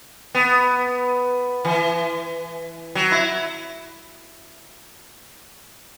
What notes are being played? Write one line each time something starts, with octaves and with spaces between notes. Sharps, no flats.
B3
E3
F#3
E4